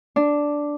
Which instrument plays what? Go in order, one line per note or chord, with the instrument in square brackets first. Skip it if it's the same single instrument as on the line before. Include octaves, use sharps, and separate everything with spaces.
[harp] D4